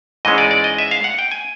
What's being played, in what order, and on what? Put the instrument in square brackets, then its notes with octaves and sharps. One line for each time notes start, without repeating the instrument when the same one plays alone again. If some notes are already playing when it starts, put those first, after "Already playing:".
[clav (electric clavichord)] G#2 E3 G#3 C#4 D#5
D5
D5
D#5
E5
F5
F#5
G5
G#5